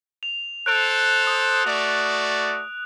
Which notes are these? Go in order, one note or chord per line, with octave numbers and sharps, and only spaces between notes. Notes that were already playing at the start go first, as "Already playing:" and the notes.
F7
A4 C5 F#6 D7 F7
D#6
A3 F#4 D5